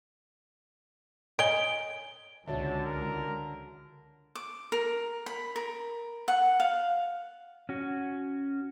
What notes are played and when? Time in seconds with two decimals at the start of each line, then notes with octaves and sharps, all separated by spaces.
1.39 C#5 D#5 G#5 D7 G7
2.48 C#2 D3 F#4 C#5 E5 A5
2.85 A#4
4.35 D6
4.72 A#4
5.26 B5
5.56 A#4
6.28 F#5
6.60 F5
7.69 C#4 F#4